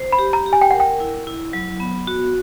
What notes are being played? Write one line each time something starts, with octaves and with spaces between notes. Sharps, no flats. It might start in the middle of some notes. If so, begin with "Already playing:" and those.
Already playing: C5
B5
G4
A#5
G4
G#5
G5
A#4 F#5
G5
E4
E4
F#3
B3
F#4